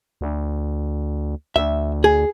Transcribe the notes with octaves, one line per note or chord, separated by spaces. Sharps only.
D2
D2 E5
G#4